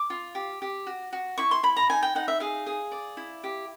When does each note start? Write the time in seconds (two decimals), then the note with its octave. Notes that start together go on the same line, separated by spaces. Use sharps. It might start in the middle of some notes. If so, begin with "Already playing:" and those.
Already playing: D6
0.10 F4
0.35 G4
0.62 G4
0.87 F#4
1.13 F#4
1.38 E4 C#6
1.51 C6
1.63 E4 B5
1.77 A#5
1.89 D#4 G#5
2.03 G5
2.15 D#4 F#5
2.28 E5
2.40 G#4 F5
2.66 G#4
2.92 D5
3.17 E4
3.44 G4